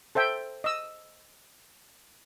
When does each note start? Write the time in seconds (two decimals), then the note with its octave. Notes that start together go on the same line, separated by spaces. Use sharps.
0.15 A4 C5 E5 G5
0.64 D#5 E6